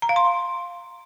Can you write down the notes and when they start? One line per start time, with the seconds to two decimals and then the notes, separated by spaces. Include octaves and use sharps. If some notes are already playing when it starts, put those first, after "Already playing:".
0.02 A#5
0.09 F5
0.16 C6